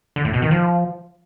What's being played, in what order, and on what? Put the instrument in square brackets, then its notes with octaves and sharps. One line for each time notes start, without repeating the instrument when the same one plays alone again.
[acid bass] D3
A2
B2
D#3
F3